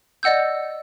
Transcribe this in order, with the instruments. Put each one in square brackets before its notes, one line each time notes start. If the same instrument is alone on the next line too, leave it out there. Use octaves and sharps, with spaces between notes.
[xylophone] D5 D#5 F#5 E6 G6